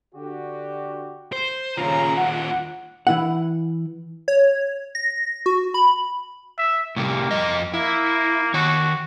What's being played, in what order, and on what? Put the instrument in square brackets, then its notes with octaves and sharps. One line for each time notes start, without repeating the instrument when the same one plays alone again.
[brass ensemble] D3 F#4 G4
[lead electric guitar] C5
[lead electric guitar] D#2 F4 [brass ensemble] C#3 A#5
[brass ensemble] F#5
[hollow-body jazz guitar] E3 E4 F#5
[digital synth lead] C#5
A#6
F#4
B5
[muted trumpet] E5
[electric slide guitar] A2 C3 G3 [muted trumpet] A#3
[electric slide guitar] F2 D#5
[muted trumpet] A#3 [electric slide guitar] E4
[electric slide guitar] D#3 C#5 [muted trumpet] F#4